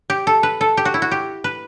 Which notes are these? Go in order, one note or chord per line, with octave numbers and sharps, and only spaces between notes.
G4
A4
B4
A4
G4
F#4
E4
F#4
G4
B4